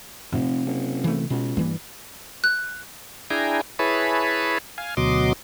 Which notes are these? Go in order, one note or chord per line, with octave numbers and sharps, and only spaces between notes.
F1 C3
F#1
E3 A3
C#2 B2
G2 E3 A#3
F#6
D4 E4 G#4 G5 G#5 A#5
E4 G#4 B4 C#5 A5 B5
F5 G#5
D2 B2 F#3 D#5 C6 D6